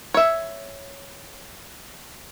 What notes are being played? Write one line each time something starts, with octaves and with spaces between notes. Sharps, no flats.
C#5 E5